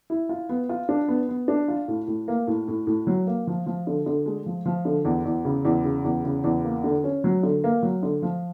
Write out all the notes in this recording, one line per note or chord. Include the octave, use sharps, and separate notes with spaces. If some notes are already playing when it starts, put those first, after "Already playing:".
E4
F4
B3
F4
D4
B3
B3
D4
F4
A2
A2
A#3
A2
A2
A2
F#3
A#3
F3
F3
D3
D3
G#3
F3
F3
D3
E2
E2
C#3
E2
C#3
E2
C#3
E2
A#3
D3
C#4
F#3
D3
A#3
F#3
D3
F3